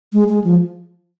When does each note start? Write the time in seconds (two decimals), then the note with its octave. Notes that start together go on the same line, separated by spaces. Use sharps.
0.13 G#3
0.29 G#3
0.44 F3